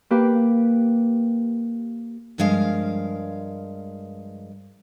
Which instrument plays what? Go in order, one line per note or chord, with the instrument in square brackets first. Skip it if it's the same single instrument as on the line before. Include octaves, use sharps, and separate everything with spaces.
[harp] A#3 G4 B4
[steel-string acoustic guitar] G2 F3 G#3 A#4 F5